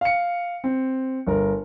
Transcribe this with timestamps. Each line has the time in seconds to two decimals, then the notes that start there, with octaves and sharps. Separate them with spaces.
0.01 F5 C#7
0.64 C4
1.27 G1 A#4